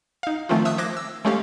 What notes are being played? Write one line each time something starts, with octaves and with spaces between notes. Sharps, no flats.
D#4 F5
D#3 F3 A3 C4 C#4 F4
E5 D#6 E6 F#6
C5 D6 F#6 G#6 A#6
E6
G#3 A3 C#4 G4 A4 F5